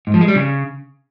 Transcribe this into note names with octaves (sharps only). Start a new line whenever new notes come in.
G#2
F3
G#3
G3
C#3